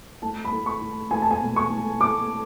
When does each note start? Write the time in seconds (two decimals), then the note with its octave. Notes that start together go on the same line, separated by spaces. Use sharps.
0.22 A3 A5
0.45 B5
0.52 A3
0.66 C#6
0.81 A3
1.11 A3 G#5
1.22 A5
1.31 G#5
1.42 B2
1.56 C#6
1.70 A3
2.00 A3 D6